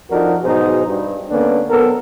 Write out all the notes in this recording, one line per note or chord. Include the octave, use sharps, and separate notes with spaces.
F2 F3 D4 D#4 F#4 A#4
G#2 B2 F#3 D#4 G#4 C5
G2
D3 A#3 B3 C#4 D4
B1 B3 C4 A4 A#4